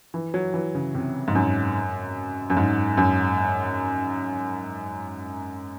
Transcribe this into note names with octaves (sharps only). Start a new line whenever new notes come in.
E3
F#3
E3
C#3
C3
G#2
F#2
F#2
G#2
F#2